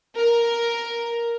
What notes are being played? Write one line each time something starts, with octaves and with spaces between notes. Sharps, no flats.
A#4